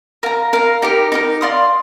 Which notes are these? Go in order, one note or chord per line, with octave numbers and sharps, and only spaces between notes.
A#4 F5 A#5
A#4 F5 A#5
D#4 G4 A#4
D#4 G4 A#4
D5 F5 C6 D#6